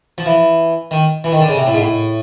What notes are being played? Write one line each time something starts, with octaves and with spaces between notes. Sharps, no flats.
F3
E3
D#3
E3
D#3
D3
C#3
C3
A2
G#2
A2